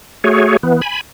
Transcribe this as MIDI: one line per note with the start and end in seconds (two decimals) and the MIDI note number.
0.24 0.57 57
0.24 0.57 66
0.24 0.57 68
0.24 0.57 73
0.63 0.81 52
0.63 0.81 59
0.82 1.01 80
0.82 1.01 83